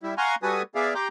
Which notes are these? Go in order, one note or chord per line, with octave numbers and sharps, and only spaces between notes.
G3 E4
F5 F#5 G#5 A#5 C6 C#6
G3 F#4 A4 B4 G#5 D#6
B3 G#4 D5 E5 F5
G4 G5 A#5 C6 D6 G6